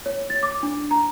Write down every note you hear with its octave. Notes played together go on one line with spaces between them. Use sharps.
C#5
A6
D6
D4
A#5